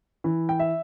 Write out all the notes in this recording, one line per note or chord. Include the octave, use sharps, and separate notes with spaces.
E3
G5
E5